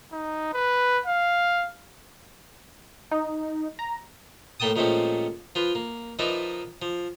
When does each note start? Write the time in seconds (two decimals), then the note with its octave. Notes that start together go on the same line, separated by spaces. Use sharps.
0.12 D#4
0.53 B4
1.06 F5
3.11 D#4
3.79 A#5
4.60 A2 A3 A#3 G5 A5 D#6
4.76 A#2 F3 G#3 A3 C4 C#4
5.55 F3 F4 B4
5.75 A#3
6.19 F3 D#4 A#4 B4 D5 E5
6.82 F3